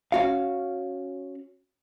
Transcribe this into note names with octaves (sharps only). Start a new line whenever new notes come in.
C#4 F#4 F5